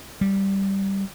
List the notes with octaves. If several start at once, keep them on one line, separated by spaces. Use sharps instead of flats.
G3